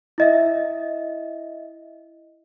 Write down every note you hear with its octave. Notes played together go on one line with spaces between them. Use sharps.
E4 D#5 E5